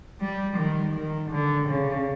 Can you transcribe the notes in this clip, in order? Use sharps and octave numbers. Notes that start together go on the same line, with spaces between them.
G3
D#3
D#3
D3
C#3